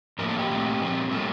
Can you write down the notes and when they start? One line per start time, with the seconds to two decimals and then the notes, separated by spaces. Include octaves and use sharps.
0.19 A2 F3 A#3 A#4
0.29 A4
0.39 G4
0.49 A#2 A3 C4
0.80 A#2 F3 C4
1.11 A2 G3 A#3 A4